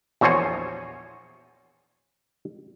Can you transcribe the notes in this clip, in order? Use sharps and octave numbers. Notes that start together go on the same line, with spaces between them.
A#1 E2 F#4 C5 C#5 G#5